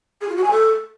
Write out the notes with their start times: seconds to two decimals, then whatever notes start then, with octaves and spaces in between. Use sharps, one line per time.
0.21 G#4
0.29 F4
0.36 F#4
0.44 G#5
0.51 A4